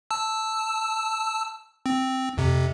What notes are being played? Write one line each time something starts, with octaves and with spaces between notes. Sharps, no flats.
A5 E6
C4
F2 C3